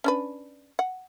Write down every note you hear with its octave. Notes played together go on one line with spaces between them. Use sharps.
C#4 D4 B4
F#5